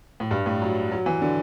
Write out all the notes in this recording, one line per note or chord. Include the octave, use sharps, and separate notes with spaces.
A2
G2
A2
F#3
F#3
E3
D3